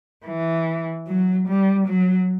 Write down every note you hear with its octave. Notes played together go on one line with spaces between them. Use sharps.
E3
F#3
G3
F#3